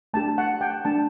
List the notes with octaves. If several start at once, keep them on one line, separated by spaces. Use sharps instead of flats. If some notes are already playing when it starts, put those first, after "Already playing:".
A3 D4 G4 A5
F#5
G5
A3 D4 G4 A5